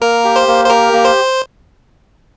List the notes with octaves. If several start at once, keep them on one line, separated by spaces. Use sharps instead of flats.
A#3 A#4
G4
C5
A#3
C5
G4 A#4
A#3
C5